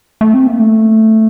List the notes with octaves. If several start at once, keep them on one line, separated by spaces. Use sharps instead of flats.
A3
C4
A#3
A3